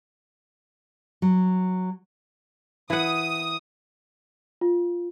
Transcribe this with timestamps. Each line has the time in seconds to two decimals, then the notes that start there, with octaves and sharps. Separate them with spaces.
1.22 F#3
2.90 E3 F#5 D#6
4.61 F4